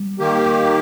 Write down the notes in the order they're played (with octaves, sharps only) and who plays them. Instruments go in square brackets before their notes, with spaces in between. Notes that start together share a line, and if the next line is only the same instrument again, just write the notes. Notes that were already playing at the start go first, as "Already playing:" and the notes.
Already playing: [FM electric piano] G3
[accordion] D#3 A#3 G4